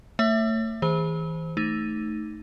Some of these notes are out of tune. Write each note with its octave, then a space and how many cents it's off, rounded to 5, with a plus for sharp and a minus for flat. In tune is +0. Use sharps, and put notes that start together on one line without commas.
A3 +35 C#5 +0 E5 +0
E3 -30 G#4 -25 C5 +0
A3 +0 D#4 +0